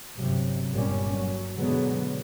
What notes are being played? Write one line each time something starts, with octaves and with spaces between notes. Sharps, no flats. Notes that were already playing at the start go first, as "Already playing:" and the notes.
G1 C3 F#3
G1 G2 A#2 G3 C#4
F#3
B2 D3 F#3 G#3 B3